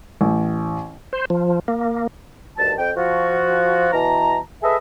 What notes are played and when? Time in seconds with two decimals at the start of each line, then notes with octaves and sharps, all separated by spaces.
0.21 A1
1.13 C5
1.30 F3
1.68 A#3
2.59 D2 G2 D#3 A5
2.79 F2 G5
2.97 F3 F4 F#4
3.93 B2 E3 A5 A#5
4.63 G#4 A4 B4 D#5 E5